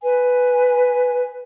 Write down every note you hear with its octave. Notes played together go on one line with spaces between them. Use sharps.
B4 G#5